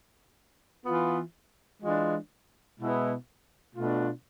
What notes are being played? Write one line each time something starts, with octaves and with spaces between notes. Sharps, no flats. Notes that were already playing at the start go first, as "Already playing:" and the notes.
E3 B3 F4
E3 G#3 D4 F4
B2 G#3 B3 E4
B2 A3 D4 F4